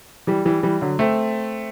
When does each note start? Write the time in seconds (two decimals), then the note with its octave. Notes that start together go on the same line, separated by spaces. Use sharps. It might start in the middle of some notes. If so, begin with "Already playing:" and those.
0.27 E3 G3
0.45 E3 G3
0.63 E3 G3
0.81 D3 F#3
0.99 A3 C4